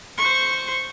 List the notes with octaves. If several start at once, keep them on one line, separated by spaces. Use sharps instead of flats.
C5 C#6